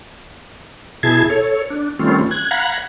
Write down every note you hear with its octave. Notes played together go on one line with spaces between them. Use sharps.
B2 E4 G#4 A5 G#6
A4 C#5
D4
D#3 G3 A3 C4 C#4 F4
F#6 G#6
F5 F#5 A#5 B5 F#6 G#6